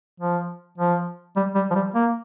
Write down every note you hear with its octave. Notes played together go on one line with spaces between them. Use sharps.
F3
F3
G3
G3
F3
G3
A#3